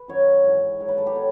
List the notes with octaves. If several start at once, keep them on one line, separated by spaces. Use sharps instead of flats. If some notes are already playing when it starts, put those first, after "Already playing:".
Already playing: B4
F#2 D#3 F#3 C#5
G#2 E3
G#2 D#3 F#3
B4
A4
G4
B2 F#3